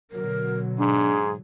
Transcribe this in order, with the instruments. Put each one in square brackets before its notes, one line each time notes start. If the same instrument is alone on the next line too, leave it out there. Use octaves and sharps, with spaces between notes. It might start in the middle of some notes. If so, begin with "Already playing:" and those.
[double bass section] B2 D3 F#3 [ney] A#4
[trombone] G#2 [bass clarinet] D4 [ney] G#4